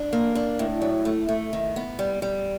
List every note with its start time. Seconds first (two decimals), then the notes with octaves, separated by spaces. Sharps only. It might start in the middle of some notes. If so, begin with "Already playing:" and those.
Already playing: D4
0.13 A#3
0.35 D4
0.59 A2
0.82 F#3
1.05 A3
1.29 A3
1.53 D#3
1.76 B3
1.99 G3
2.22 G3